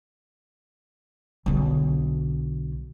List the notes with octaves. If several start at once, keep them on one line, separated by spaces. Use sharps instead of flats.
B1 D3